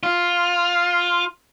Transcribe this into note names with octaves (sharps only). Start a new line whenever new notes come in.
F4